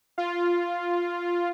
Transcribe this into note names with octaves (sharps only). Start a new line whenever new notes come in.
F4